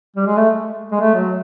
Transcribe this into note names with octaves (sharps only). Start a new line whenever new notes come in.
G3
G#3
A3
G#3
A3
F#3